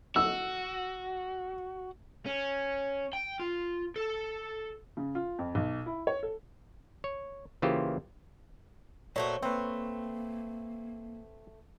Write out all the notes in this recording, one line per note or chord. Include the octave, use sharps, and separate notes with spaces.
F#4 E6
C#4
G5
F4
A4
C#3
F4
F2
B1
E4
C#5
A4
C#5
C#3 E3 A#3 F4 G4 C5
A#2 A3 F#4 C5 C#5
A3 A#3 C4 B4